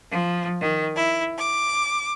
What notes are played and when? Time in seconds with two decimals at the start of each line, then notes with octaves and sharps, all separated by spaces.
0.10 F3
0.61 D#3
0.95 E4
1.37 D6